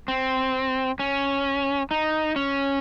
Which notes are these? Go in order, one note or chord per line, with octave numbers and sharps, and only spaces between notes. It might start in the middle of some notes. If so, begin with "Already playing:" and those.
C4
C#4
D#4
C#4